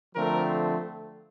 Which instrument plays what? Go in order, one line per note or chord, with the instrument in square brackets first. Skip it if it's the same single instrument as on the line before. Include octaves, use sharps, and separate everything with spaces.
[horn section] D3 F3 A3 C4 A#4